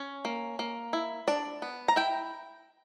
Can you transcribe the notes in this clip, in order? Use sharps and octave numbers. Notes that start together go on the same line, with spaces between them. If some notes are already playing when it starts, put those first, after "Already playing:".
Already playing: C#4
A#3
A#3
E4
D4 D5
B3
A#5
E4 G5